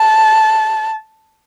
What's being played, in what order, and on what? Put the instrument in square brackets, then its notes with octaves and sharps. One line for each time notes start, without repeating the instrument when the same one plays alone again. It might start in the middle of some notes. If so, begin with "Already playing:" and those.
Already playing: [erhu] A5